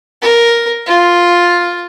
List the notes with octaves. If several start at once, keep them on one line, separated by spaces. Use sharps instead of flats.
A#4
F4